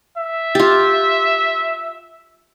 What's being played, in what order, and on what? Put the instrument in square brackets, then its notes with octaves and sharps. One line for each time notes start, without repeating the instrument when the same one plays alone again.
[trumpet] E5
[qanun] F4 G4